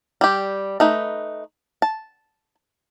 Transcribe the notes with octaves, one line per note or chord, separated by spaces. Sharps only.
G3 G4
A3 D#4 B4
A5